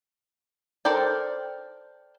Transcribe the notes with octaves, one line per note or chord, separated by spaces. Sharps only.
A4 A#4 C5 D5 G5